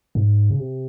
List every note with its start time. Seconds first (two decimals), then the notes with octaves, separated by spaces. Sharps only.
0.15 G#2
0.50 C#3
0.59 C3